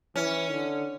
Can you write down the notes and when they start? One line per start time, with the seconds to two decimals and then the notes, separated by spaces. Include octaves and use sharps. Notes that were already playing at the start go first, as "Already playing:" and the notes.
0.16 E3 C#4
0.52 D3